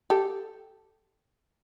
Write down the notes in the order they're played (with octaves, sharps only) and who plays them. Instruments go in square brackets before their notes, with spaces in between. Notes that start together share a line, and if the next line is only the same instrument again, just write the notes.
[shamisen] G4 A4